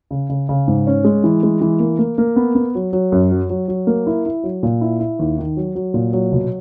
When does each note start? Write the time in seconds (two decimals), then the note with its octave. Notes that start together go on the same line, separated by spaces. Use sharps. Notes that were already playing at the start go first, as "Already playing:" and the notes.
0.11 C#3
0.29 C#3
0.49 C#3
0.68 G#2
0.87 C#4
1.04 G#3
1.24 E3
1.43 G#3
1.61 E3
1.80 A#3
1.99 A#3
2.18 A#3
2.36 B3
2.55 B3
2.75 F#3
2.93 F#3
3.12 F#2
3.31 F#3
3.50 F#3
3.68 F#3
3.87 A#3
4.07 E4
4.25 E4
4.44 F#3
4.63 A#2
4.81 E4
5.00 E4
5.19 D#2
5.38 D#3
5.57 F#3
5.75 F#3
5.94 A#2
6.13 F#3
6.32 B2